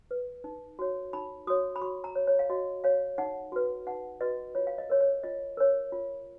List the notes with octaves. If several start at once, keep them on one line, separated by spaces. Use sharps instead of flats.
B4
D#4
F#4 C#5
D#4 B5
F#4 C#5 D#6
B5
F#4 C#6
A#5
C#5
C#5
F5
F#4 D#5
C#5 F5
D#4 F#5
F#4 B4
D#4 F#5
F#4 B4 D#5
F4 C#5
F5
D#5
A#4 C#5
C#5
F4 D#5
A#4 C#5
F4